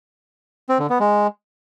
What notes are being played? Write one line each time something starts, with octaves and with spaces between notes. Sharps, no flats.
C4
D3
B3
G#3